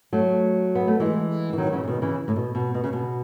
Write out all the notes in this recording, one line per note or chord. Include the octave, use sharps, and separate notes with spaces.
F#3 A3
B3
A3
E3 G#3
E3
D#3 F#3
C#3 E3
C#3
B2 D#3
C#3 E3
A2
B2
B2
B2
C#3
B2